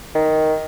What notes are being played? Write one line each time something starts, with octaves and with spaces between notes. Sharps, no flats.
D#3